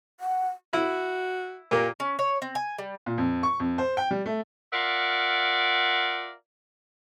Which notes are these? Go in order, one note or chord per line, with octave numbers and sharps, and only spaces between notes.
F#5
E4 F#4
A#2 A#3 G4
C#4
C#5
C4
G#5
G3
A#2
F2
C#6
F2
C5
G5
G3
A3
F4 A#4 D5 E5 F#5